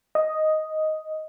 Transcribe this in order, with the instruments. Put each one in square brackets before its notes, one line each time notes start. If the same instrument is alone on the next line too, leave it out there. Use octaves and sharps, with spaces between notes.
[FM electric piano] D#5